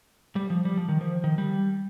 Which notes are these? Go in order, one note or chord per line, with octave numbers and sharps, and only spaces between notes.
G3
F3
G3
F3
D#3
F3
D#3
G3